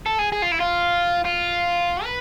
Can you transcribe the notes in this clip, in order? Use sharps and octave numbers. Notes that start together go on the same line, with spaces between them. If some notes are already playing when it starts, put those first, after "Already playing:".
A4
G#4
G#4
F4
E4
F4
F4
B4